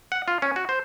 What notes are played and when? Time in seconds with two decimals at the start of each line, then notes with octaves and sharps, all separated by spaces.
0.12 F#5
0.28 F4
0.42 C#4
0.56 F#4
0.69 C5